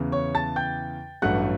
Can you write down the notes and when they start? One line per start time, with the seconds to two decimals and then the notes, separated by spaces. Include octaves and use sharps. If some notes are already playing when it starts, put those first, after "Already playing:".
Already playing: E2 C#3 E3
0.12 C#5 C#6
0.35 A5 A6
0.56 G5 G6
1.22 A1 G2 F#3 A3 F#5 F#6